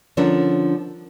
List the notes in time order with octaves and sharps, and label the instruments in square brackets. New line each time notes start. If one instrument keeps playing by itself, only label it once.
[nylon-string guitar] D3 F3 C#4 D4 A#4